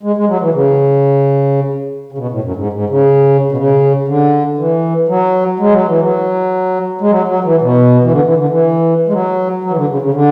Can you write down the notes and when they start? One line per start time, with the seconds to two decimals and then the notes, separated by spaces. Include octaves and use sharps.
0.03 G#3
0.16 G#3
0.29 F#3
0.41 E3
0.54 C#3
2.12 C#3
2.18 B2
2.31 A2
2.44 F#2
2.56 G#2
2.73 G#2
2.90 C#3
3.52 B2
3.57 C#3
4.08 D3
4.58 E3
5.08 F#3
5.60 G#3
5.73 F#3
5.87 E3
6.01 F#3
7.01 G#3
7.11 F#3
7.28 F#3
7.44 E3
7.62 B2
8.03 E3
8.12 D3
8.25 E3
8.38 D3
8.50 E3
9.08 G#3
9.13 F#3
9.64 F#3
9.70 E3
9.77 D3
9.89 C#3
10.02 C#3
10.14 D3